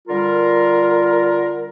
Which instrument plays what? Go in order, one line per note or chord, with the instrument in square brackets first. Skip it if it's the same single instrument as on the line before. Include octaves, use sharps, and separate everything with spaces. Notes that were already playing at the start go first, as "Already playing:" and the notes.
[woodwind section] D3 G3 F4 A#4